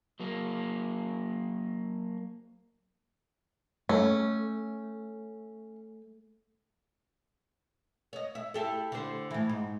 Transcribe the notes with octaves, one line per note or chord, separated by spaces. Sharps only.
F#3 A#3
A3 C#4
C#5 D#5
E5
E4 G4 A4
D3 C5
A2 E3
G#2